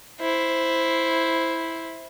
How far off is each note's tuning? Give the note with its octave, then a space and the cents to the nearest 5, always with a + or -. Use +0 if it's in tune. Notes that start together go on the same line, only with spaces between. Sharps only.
E4 +0 C5 +0